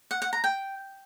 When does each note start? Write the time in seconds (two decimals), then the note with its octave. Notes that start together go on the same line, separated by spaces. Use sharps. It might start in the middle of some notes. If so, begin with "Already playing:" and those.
0.11 F#5
0.22 F#5
0.33 A#5
0.44 G5